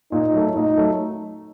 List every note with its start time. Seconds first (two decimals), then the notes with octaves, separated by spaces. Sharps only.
0.12 A#2 D#4
0.33 F#3 A3
0.55 A#2 D#4
0.78 F#3 A3